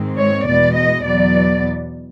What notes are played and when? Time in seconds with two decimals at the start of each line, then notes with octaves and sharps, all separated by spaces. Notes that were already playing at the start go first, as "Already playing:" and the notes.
Already playing: G#2 D#3 G#3 C4
0.17 C#5
0.46 E2 B2 G#3 B3 D5
0.76 D#5
1.05 E2 B2 F#3 B3 D5